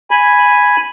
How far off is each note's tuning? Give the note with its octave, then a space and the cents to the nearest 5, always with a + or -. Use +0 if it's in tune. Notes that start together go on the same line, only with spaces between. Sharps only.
G#5 +0 B5 +0